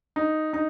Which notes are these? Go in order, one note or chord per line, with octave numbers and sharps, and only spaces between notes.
D#4
D#4